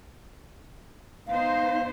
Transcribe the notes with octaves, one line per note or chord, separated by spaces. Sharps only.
B3 D#4 C5 F5